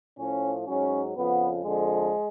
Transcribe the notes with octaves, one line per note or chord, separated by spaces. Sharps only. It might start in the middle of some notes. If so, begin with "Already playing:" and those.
A2 F3 C#4
G#2 F#3 C#4
F2 C#3 F3 B3
F2 D3 F3 G#3